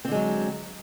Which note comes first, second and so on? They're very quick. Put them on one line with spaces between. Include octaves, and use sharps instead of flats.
C4 D3 G#3 F#3